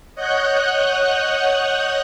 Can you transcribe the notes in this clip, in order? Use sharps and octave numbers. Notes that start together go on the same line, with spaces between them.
C#5 D#5 F#5 F#6 G6